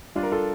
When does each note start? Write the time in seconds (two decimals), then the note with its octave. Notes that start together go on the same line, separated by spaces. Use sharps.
0.15 G3 D4 F4
0.23 A#4
0.31 F4 A4